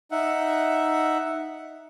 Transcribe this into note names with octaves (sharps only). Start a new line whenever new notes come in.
D#4 E5 F#5